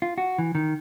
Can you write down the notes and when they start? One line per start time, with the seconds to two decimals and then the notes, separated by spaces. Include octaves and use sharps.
0.02 F4
0.18 F#4
0.38 E3
0.55 D#3